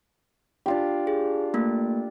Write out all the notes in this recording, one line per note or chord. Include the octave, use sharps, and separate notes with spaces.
D4 F4 G4
G#4
A3 A#3